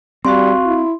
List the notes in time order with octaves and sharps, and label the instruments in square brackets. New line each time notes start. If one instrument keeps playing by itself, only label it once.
[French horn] G3 [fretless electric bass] C4 [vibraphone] F#4 F5 C#6 [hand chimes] C6
[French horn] E4